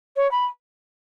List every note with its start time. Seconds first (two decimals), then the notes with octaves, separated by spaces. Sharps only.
0.16 C#5
0.31 B5